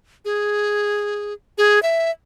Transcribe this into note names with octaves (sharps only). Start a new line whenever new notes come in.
G#4
G#4
E5